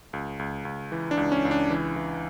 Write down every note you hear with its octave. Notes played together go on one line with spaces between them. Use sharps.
C#2
C#2
C#2
E3
D4
C#2
C#4
C#2
D4
E3
E3